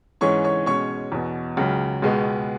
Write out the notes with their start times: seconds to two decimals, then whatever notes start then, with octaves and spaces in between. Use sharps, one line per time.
0.21 G#2 E3 C#4 C#5 C#6
0.44 C#5 C#6
0.66 B2 G#3 C#4 C#5 C#6
1.12 E2 B2 B3
1.57 C#2 C#3 F#3
2.02 C#2 B2 G#3 B3